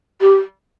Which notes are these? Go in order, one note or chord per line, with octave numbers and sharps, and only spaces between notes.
G4